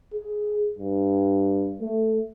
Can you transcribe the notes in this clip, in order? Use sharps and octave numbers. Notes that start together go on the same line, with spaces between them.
G#4
G2
A3